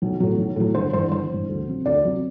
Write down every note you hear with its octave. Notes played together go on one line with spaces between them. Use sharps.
B1
A2 F#3
B1
A2 F#3
G1 C5
G2 E3 C5
G1 C5
G2 E3
D2
C3 F#3
D2 D5
C3 F#3